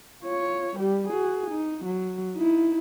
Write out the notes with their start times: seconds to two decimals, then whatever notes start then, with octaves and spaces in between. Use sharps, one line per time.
0.23 F4 C#5
0.76 G3 G4
1.08 F#4 G#4
1.51 D#4
1.85 F#3
2.35 D#4 E4